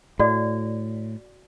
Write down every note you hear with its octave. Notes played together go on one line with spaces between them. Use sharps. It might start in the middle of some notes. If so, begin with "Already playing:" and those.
A2 F#4 D5